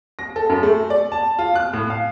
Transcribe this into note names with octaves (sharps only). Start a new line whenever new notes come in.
A#6
A4
F#2
A3
D5
A5
F4
F#6
A2
F5